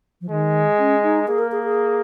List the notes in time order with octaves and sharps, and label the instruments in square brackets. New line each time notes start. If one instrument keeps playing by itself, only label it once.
[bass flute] F3
[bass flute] D#3 [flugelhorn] G#3
[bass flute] C#4
D#4
[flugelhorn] A#3 [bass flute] G#4
[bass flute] A#4
G#4
G#4